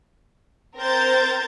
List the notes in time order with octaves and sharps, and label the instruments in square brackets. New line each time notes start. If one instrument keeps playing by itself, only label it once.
[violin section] C4 A#4 C5 A#5 G6 A6